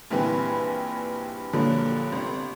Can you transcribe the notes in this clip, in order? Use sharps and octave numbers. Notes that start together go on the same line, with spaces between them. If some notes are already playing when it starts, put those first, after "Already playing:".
A#1 G2 E3 C4 B4 G#5
G2 A#2 D3 F3 F#3
G1 C3